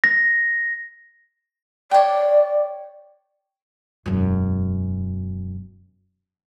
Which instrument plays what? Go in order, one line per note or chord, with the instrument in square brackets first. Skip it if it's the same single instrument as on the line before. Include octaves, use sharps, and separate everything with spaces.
[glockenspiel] A#6
[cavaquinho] C#5 G5 [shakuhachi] D5
[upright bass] E1 F#2